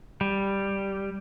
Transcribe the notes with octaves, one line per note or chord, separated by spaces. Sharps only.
G3